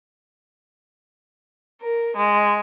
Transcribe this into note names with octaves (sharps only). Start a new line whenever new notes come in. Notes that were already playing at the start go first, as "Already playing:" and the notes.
A#4
G#3